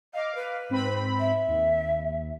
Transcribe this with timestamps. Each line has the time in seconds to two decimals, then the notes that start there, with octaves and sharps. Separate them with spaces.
0.13 D#5 F5 D6
0.34 B4
0.69 G#2 C4 B5
1.19 E5
1.47 D#2